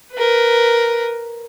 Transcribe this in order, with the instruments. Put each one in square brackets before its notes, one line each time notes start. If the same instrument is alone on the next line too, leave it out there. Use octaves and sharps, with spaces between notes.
[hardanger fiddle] A#4 B4